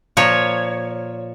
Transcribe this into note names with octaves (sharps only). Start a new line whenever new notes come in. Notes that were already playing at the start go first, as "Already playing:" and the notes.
A#2 F3 C#5